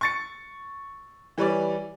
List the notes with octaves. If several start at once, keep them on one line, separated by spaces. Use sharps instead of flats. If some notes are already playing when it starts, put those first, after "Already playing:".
C#6 A6 C#7
E3 G3 B4 C#5 D5